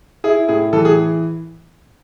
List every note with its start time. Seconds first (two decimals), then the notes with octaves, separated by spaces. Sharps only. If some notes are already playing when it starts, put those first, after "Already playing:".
0.24 E4 G#4
0.48 A2 G#4
0.73 E3 A4
0.85 G#4